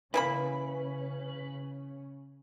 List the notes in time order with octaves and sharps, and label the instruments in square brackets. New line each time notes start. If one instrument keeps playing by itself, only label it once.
[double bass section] C#3 C#4 [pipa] E3 A#3 B5 [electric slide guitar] B4